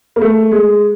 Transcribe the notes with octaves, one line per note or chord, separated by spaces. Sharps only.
A#3
A3
G#3